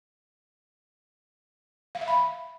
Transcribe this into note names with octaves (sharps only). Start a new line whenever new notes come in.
F5
E5
B5